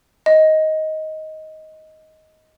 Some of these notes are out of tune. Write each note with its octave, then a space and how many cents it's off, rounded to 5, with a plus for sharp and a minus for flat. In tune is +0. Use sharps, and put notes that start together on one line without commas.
D#5 +10